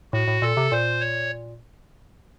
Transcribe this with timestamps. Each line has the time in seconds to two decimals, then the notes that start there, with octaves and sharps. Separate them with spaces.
0.13 A2 F#4
0.28 A2
0.42 A#2 A4
0.57 C3
0.72 A#2 C5
1.01 C#5